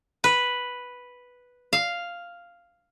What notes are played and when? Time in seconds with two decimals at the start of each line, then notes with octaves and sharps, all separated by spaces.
0.24 B4
1.73 F5